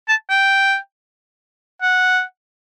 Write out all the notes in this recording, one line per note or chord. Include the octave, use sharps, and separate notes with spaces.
A5
G5
F#5